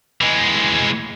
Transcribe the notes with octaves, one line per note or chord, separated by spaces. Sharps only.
E3 G#3